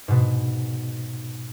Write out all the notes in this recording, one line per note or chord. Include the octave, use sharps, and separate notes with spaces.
G#2 B2